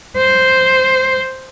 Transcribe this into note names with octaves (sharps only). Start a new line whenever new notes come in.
C5